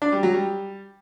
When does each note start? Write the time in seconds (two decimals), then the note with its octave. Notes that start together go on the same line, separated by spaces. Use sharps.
0.02 D4
0.12 G3
0.23 F#3
0.34 G3